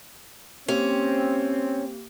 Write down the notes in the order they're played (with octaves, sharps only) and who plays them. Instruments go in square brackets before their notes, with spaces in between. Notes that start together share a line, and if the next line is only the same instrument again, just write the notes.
[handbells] A#3 G4 [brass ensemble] C4 [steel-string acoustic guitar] C#4